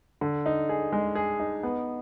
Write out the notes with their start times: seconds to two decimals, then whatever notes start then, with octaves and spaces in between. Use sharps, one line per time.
0.21 D3
0.46 D#4
0.69 G#4
0.92 G#3
1.15 G#4
1.39 D#4
1.63 B3